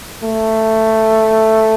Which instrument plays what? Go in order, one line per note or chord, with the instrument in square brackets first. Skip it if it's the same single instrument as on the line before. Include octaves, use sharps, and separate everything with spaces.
[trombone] A3